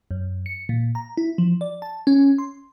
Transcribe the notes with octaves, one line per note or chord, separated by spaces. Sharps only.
F#2
C#7
A#2
A#5
E4
F3
D5
A5
C#4
C6